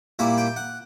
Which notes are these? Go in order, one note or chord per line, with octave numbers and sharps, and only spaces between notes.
A#2 G3 A#3 E4 B5
G5
F#5